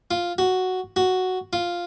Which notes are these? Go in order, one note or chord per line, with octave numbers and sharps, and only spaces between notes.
F4
F#4
F#4
F4